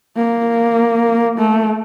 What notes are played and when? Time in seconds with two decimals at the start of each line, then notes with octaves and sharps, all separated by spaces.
0.16 A#3
1.39 A3